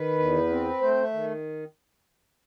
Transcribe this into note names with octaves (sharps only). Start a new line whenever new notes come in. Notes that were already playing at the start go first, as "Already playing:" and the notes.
Already playing: D#3 B4
E2
C4
A3 C5
E5
D#3